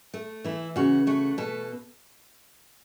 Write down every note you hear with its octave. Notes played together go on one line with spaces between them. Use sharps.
A3
E3 E4
C#3 F#4
A3 F#4
B2 A4